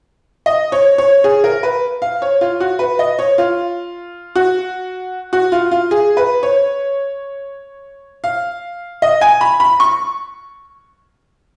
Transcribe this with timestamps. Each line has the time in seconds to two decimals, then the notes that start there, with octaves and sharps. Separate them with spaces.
0.46 D#5
0.72 C#5
0.98 C#5
1.24 G#4
1.44 A#4
1.63 B4
2.02 F5
2.22 C#5
2.41 F4
2.60 F#4
2.79 B4
2.99 D#5
3.19 C#5
3.38 F4
4.35 F#4
5.33 F#4
5.52 F4
5.71 F4
5.91 G#4
6.17 B4
6.43 C#5
8.24 F5
9.02 D#5
9.21 G#5
9.41 B5
9.60 B5
9.80 C#6